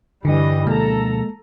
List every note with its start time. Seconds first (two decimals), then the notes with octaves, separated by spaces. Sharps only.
0.25 G2 D3 E3 G3 D4 D#5
0.67 B2 F3 G#3 A#3 A4 A#5